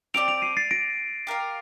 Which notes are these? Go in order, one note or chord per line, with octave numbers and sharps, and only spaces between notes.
C4 G4 D5 A5 D7 F7
D7 F7
C7 D#7
A6 C7
A#6 D7
G4 A#4 F5